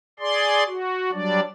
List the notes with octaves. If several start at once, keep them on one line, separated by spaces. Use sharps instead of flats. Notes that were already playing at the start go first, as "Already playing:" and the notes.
G#4 D5 C6
F#4
F#3 G3 D4 D5